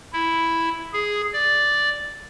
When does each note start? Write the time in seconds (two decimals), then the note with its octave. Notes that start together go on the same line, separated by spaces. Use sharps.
0.13 E4
0.93 G#4
1.33 D5